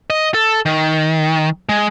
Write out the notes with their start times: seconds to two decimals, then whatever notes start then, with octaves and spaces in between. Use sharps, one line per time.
0.10 D#5
0.34 A4
0.66 D#3
1.69 G#3